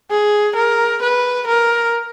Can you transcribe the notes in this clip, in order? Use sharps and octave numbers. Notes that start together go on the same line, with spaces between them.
G#4
A#4
B4
A#4